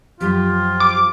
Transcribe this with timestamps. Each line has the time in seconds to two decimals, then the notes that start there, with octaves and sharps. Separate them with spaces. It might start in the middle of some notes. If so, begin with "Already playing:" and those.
0.21 F#2 F3 F4 G4
0.80 D6